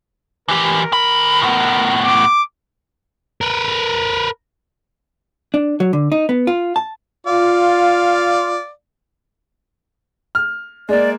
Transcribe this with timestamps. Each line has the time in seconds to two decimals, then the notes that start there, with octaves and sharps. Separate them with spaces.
0.48 E3 G4 A#4
0.92 D2 B5
1.42 A2 B3
2.04 D6
3.41 A#4 B4
5.54 D4
5.80 F#3
5.93 D3
6.12 D#4
6.29 B3
6.47 F4
6.76 A5
7.27 F4 D5 F5
10.35 F6
10.89 G#3 A#3 D5